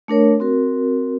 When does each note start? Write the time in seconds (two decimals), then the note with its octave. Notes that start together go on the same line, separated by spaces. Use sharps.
0.08 A3 D4 A#4 C#5
0.40 C4 F#4 A#4